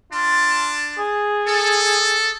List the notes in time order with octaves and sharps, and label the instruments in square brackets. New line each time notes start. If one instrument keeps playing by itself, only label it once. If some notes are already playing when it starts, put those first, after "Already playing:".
[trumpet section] D4 A5 [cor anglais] F4
[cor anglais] G#4
[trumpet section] A4